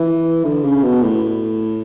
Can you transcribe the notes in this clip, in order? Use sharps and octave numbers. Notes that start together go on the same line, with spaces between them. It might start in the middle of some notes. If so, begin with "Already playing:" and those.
Already playing: E3
D3
C#3
B2
A2